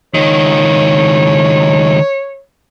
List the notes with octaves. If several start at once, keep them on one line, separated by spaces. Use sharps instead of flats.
C#2 D#3 C#5